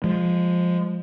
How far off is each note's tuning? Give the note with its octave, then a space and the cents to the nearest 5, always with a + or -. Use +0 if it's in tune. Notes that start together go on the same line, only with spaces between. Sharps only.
F3 +10 G#3 -10